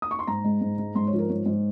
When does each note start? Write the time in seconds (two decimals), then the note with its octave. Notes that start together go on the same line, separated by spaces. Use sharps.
0.02 D#6
0.11 C#6
0.19 C6
0.27 G#2 A#5
0.44 G#3
0.61 G#2
0.78 G#3
0.95 G#2 C6
1.07 C#5
1.13 F3
1.18 A#4
1.29 G#2 C#5
1.46 G#2